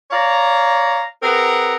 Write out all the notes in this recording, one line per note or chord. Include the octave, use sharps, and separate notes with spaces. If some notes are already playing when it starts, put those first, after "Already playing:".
C#5 D5 F5 A#5
C4 G#4 A#4 B4 F#5 A#5